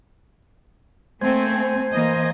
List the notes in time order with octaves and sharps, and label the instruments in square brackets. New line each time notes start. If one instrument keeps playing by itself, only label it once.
[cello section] A3 A#3 C4 [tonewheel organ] C5 G#5
[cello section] E3 A#3 D#5